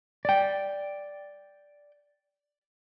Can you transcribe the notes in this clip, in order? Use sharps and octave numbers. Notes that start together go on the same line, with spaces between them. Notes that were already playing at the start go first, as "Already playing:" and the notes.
D5 G5